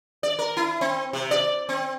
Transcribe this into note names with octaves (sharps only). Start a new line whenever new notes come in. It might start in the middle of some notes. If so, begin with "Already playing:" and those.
D5
A#4
E4
C4
C3
D5
C4